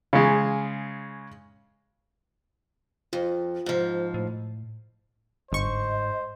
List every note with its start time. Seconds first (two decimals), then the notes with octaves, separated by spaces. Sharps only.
0.13 C#3 G#3
3.13 F2 F4
3.66 G#2 F3
4.14 A2
5.52 G1 G#2 C5 D#5 C#6